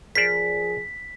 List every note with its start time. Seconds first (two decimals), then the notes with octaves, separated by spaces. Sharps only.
0.15 F3 G#4 A#4 C5 D5 B6